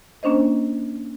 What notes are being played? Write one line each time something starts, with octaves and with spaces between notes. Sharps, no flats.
A#3 C#4 D4 C5 D#5